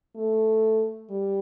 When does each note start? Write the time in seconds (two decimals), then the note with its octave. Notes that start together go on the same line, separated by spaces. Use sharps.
0.16 A3
1.10 G3